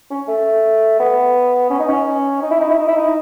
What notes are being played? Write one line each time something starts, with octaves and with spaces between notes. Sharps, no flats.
C#4
A3
B3
C#4
D#4
C#4
D#4
E4
D#4
E4
D#4
E4
D#4